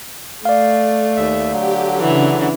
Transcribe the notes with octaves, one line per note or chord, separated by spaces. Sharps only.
A3 D5 F5
D#2 E5
D3 F#3 G4
C#3 E3 D4